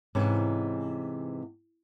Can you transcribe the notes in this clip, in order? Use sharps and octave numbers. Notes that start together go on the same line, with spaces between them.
G#2 C3 E3 G#3 C#4